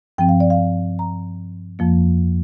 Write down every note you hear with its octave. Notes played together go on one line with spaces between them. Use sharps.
G2 F3 C4 G5
F5
D5
F5
A#5
F2 F3 A#3